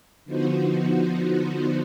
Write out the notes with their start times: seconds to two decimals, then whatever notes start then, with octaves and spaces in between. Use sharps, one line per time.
0.25 D3 F3 B3 D#4 F#4 C5